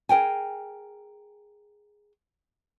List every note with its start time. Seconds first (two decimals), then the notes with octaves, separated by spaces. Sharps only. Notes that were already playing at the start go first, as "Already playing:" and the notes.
0.09 G#4 A#4 G5 G#5